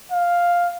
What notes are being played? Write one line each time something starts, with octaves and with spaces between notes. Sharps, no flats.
F5